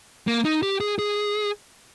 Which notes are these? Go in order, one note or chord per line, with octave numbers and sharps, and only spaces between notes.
A#3
D#4
G4
G#4
G#4